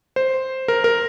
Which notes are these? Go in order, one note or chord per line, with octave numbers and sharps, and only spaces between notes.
C5
A#4
A#4